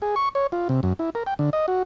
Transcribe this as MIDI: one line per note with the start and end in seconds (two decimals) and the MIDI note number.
0.02 0.15 68
0.16 0.29 85
0.35 0.47 73
0.52 0.68 65
0.69 0.80 48
0.83 0.93 42
0.99 1.10 64
1.15 1.23 70
1.26 1.34 79
1.39 1.50 50
1.53 1.66 75
1.68 1.83 66